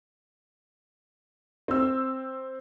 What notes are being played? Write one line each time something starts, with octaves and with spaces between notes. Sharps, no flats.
C4 E6